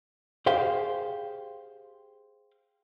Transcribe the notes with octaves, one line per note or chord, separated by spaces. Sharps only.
G4 G#4 C5 F5 G5